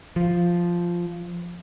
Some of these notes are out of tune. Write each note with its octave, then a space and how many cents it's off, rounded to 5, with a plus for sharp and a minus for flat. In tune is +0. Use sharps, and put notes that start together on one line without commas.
F3 -5